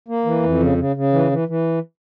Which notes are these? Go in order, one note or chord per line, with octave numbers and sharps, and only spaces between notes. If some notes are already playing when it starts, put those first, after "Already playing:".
A#3
E3
F2
C#3
C#3
C#3
E3
E3
E3